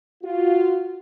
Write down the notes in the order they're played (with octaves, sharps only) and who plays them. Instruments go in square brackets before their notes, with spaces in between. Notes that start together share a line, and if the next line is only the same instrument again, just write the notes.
[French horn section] F4 F#4